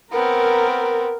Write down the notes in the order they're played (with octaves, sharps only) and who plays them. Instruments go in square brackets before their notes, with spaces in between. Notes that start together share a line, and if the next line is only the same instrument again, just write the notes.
[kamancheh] B3 C4 [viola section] A#4